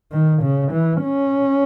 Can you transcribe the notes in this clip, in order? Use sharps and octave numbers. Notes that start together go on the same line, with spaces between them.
D#3
C#3
E3
C#4